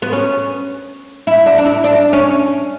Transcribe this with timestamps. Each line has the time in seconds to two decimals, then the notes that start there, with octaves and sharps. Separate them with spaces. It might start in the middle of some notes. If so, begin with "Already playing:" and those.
0.02 B3
0.13 C#4
1.27 E4
1.46 D4
1.58 D4
1.66 E4
1.84 D4
2.13 C#4